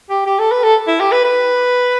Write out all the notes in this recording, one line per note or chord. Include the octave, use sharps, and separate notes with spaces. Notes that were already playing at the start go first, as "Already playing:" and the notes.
G4
G4
A4
B4
A4
E4
G4
B4
B4